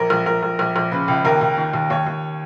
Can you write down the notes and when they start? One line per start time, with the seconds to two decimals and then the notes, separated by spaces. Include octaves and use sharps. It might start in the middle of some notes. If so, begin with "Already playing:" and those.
Already playing: A#1 A#4
0.10 A#1
0.26 A#1 A#4
0.43 A#1
0.59 A#1
0.76 A#1
0.92 C#3 B4
1.08 C#2
1.25 D#2 A#4
1.41 D#2
1.58 D#3
1.73 D#2
1.90 D#2 C#5
2.07 D#2